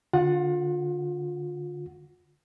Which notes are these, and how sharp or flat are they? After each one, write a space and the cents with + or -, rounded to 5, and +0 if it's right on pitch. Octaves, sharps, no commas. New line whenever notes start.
D3 +0 F4 +30 F#5 +0